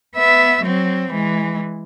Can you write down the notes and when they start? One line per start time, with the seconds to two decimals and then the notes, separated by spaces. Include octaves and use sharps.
0.16 B3 E5
0.64 F#3 C4
1.11 E3 G#3